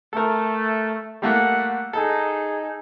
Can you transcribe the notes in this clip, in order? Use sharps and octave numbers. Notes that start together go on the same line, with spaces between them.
A3 A4 A#4
G3 A3 A#3 F#5
D#4 G#4 A4